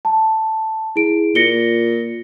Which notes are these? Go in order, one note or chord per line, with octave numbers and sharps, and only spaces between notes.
A5
E4 G#4 D7
A#2 A#6 C#7 G7